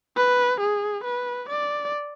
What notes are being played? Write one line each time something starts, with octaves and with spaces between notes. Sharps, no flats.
B4
G#4
B4
D5